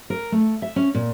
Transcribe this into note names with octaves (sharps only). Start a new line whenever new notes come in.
A#4
A3
E5
C#4
A#2